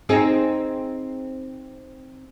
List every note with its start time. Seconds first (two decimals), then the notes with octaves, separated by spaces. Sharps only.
0.09 C4 D#4 G#4